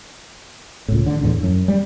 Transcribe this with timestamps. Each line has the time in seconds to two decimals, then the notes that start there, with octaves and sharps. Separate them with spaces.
0.88 C#2 A2
1.06 D3
1.21 E2 A2 D3
1.43 F#2
1.68 G3